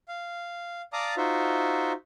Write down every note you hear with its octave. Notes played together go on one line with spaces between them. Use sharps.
F5
D5 F5 A5 A#5 D6 D#6
D#4 F4 F#4 C5 E5